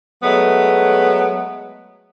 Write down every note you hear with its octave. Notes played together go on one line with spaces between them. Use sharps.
F#3 G#3 A3 B3